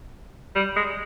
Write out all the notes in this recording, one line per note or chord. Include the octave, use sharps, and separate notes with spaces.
G3
G#3